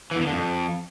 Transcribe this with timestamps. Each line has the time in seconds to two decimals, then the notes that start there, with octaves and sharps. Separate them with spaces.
0.11 E3
0.16 E2
0.22 E3
0.27 D3
0.32 F2